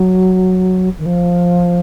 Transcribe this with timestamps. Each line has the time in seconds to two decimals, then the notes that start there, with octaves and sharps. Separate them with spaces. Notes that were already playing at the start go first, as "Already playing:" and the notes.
Already playing: F#3
0.99 D#3
1.06 F3